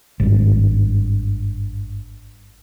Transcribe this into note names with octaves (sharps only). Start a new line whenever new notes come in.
G#1 G2